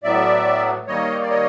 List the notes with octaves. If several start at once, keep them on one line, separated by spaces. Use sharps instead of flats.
A2 F#3 B3 D5 E5
D#3 G3 A#3 C#5 D#5
D5
C#5 D#5